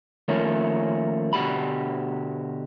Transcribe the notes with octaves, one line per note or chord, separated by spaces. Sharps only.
D#3 F3 A3 A#3 C#4
B2 D3 F#4 G4 B5